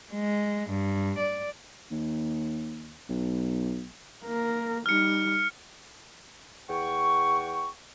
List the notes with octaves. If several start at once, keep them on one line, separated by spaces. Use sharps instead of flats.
G#3
G2
D5
D#2
B1
A#3 A#4
G3 D#4 F6 C#7
E2 F#5 G5 C#6